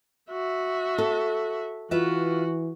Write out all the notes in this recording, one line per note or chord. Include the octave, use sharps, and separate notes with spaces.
F#4 E5
A4
E3 F4 F#4 B4 E5